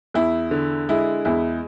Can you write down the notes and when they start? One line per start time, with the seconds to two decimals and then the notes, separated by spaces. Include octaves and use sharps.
0.14 E2 E4
0.51 D3
0.89 G#3 E4
1.25 E2 E4